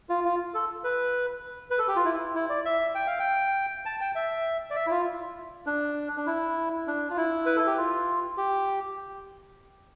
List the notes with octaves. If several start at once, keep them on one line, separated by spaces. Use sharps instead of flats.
F4
F4
A4
B4
B4
A4
G4
F4
E4
E4
D5
E5
G5
F5
G5
A5
G5
E5
D5
E5
E4
F4
D4
D4
E4
D4
F4
E4
B4
A4
G4
F4
G4